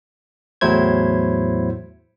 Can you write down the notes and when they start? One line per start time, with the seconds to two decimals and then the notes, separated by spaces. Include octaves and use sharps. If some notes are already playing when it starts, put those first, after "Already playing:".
0.61 E2 A2 F#3 E4 C5 G#6